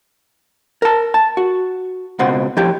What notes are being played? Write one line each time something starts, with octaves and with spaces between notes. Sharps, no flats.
A#4 A5
A5
F#4
C#2 B2 C4 F#5
F3 E4 G4